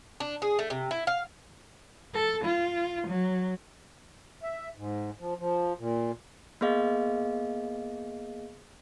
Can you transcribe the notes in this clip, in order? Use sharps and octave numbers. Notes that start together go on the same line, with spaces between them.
D4
G#4
A3
C3
E4
F5
A4
F4
F#3
E5
G#2
F3
F3
A#2
A#3 B3 G#4 D#5 F5